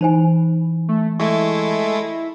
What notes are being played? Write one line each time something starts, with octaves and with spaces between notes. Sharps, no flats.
E3 D#4 C5 G#5
A3
G#3 A3 E4 C#6